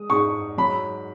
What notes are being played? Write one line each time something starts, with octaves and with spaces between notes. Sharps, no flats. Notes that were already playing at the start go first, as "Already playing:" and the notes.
Already playing: G#3 D#6
G#2 C#6
F#3 B5